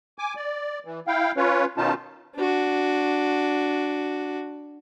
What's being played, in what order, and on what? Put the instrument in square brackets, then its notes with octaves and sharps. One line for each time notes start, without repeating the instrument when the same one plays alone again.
[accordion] G#5 D6
D5
E3
E4 F5 G5
C#4 F4 B4 C#5
B2 D#3 C#4 D#4 F4 A5
[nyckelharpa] D4 F#4